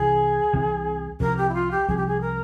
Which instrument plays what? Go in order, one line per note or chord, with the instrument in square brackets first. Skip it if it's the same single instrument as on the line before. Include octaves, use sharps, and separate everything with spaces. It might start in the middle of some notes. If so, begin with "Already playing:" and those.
Already playing: [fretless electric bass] C2 C3 E3 [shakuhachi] G#4
[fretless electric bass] C2 C3 E3
[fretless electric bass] C2 C3 F3 [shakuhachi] A#4
[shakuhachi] G4
E4
F4
G4
[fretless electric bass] C2 C3 F3 [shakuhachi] G#4
[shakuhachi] G4
G#4
A#4